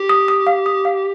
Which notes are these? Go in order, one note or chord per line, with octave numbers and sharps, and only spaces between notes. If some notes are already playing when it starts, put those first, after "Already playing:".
Already playing: G4
D#6
D#6
F5
D#6
F5